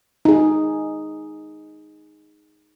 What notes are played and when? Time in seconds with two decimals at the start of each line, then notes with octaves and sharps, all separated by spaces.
0.25 D#4 G#4